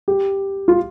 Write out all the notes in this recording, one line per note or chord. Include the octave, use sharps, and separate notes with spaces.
G4
F4